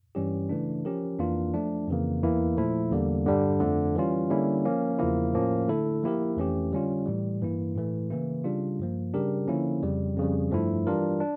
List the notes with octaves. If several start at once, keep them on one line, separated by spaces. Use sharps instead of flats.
G2 E3 G3 C#4 G4
C#3 E3 A3 D4
F3 C#4 G4 A#4
F2 E3 A#3 D4 F4
F3 A3 D4
F2 C#3 E3 A#3
E2 E3 A#3 E4
A#2 F3 A3 E4
E2 D3 G3 A#3
G2 D3 G3 D4
F2 D3 F3 A3
E3 G3 C#4 F4
D3 G3 A#3 C#4 E4
F3 A#3 C#4
E2 C#3 F3 A#3 E4
A2 F3 A#3 C#4
D3 A3 E4 A4
F3 A#3 E4 G4 A#4
F2 E3 A3 C#4 G4
D3 G3 C#4 F4
A2 E3 G3
G2 E3 A#3 E4
A2 E3 A3
C#3 E3 A#3 E4
C#3 G3 D4 F4
G2 F3 A#3
C#3 G3 D4 G4 A#4
D3 F3 A#3 C#4 E4
F2 C#3 G3
F2 C#3 G3
G2 F3 A3 E4
E3 G3 D4 F4 A#4
D4